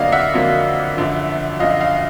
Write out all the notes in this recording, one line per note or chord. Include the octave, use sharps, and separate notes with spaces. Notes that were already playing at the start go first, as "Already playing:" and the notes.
Already playing: F2 D3 F#3 A#3 D5 D#5 F5
E5 F#5
F2 D3 F#3 A#3
F#2 D3 F3
F#2 D3 F3 D#5 F5
D#5 F5